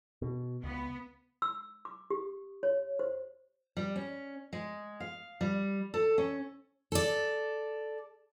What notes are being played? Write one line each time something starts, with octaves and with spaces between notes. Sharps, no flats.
B2
C#2 B3
E6
D6
G4
C#5
C5
G3
C#4
G#3
F5
G3
A4
C#4
A4 D5